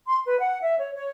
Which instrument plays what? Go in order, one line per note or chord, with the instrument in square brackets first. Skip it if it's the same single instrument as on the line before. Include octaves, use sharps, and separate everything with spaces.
[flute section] C6
B4
F#5
E5
C#5
C#5